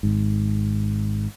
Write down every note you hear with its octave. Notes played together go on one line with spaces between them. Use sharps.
G#1 G#2